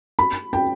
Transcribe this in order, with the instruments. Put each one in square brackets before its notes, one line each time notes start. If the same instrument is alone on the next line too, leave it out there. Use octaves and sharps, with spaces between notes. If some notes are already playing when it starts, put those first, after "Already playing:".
[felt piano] B5
G5